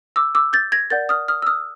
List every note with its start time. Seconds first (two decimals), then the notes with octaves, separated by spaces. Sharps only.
0.16 D6 E6
0.35 D6 E6
0.53 G6 A6
0.72 G#6 A#6
0.90 A#4 D5 F#5 G6 A6
1.09 D#6 F6
1.28 D#6 F6
1.42 E6
1.47 D#6 F6